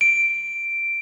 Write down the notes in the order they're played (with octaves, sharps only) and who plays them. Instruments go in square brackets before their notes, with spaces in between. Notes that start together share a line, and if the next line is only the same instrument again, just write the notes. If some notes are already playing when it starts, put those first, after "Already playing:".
[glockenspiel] D7